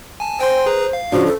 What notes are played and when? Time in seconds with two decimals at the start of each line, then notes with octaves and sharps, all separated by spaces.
0.20 G#5 A5
0.40 C5 G5 G#5 C6
0.66 G#4 B4 A#5
0.93 F5
1.12 C#3 F3 D4 F#4
1.26 A4